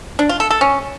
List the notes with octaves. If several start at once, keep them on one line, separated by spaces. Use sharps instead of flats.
D4
F4
A4
A4
C#4